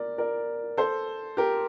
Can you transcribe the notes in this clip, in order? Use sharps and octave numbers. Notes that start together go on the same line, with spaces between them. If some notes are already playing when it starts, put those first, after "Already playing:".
Already playing: A#4 D5
A#4 D5
A4 C5
G4 A#4